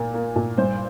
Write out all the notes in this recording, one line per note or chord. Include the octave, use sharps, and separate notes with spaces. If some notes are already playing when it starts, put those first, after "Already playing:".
Already playing: A#2 A#3
A#3
A#2
G2 C5